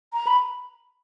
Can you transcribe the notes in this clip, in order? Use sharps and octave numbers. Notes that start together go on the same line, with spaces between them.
A#5
B5